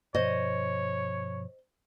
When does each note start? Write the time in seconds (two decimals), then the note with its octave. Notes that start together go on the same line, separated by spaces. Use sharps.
0.15 G2 B2 F3 C5 C#5 D#5